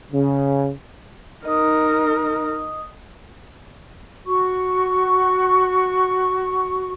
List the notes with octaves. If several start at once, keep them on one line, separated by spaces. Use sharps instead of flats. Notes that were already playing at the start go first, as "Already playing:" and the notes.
C#3
D#4 A#4 D#5 D#6
F#4 C#6